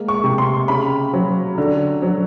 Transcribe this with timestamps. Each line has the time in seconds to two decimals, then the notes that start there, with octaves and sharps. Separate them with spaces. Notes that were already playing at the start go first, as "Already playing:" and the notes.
Already playing: G#3 A#3
0.08 C#6
0.24 C3
0.38 C6
0.68 C#3 B5
1.13 F#3
1.58 D3
2.02 F#3